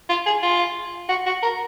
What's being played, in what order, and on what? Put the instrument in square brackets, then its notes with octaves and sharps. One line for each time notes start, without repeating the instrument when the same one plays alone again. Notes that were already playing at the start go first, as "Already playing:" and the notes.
[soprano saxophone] F4
G#4
F4
F#4
F#4
A#4